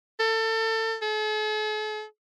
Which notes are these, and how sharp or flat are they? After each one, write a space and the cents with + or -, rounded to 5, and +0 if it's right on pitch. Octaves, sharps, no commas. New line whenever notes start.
A4 +25
A4 -45